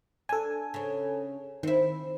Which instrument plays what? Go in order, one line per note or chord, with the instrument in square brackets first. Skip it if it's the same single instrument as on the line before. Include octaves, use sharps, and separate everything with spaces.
[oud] D4 [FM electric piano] A4 G#5
[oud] C#3 C#4
[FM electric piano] D#3 [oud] C4 E4